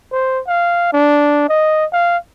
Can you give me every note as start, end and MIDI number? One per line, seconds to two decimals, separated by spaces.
0.12 0.40 72
0.47 0.92 77
0.93 1.47 62
1.49 1.85 75
1.92 2.17 77